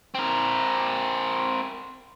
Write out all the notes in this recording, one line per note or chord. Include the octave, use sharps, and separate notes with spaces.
C4 A#4